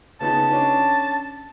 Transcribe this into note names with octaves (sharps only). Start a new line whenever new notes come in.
C#3 B3 D#4 A5
C#4 D4